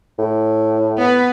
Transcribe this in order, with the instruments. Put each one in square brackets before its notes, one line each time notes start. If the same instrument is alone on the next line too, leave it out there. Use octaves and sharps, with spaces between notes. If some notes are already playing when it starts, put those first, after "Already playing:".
[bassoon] A2
[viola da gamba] B3 B4